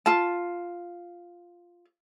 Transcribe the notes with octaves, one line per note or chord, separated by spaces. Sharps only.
F4 A5